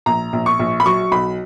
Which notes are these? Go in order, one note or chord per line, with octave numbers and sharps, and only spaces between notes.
A#1 A#5
A#1
C#6
A#1
B5
F#3 C#6
B1 B5